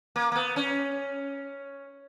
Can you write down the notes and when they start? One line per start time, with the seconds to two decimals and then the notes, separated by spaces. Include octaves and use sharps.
0.16 A#3
0.32 A#3
0.36 B3
0.56 C#4